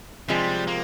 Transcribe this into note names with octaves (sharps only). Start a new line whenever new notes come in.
C3 F3 G3 G#3
A#3